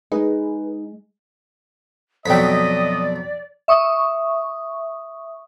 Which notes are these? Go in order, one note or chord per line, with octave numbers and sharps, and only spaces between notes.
G#3 D#4 G#4 B4
F2 B2 F#3 D5 D#5 G5 B6
E5 C#6 D#6